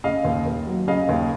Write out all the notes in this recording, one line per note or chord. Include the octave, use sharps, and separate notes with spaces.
C#3 D#5 F5
D#2
D#2
F#3
C#3 D#5 F5
D#2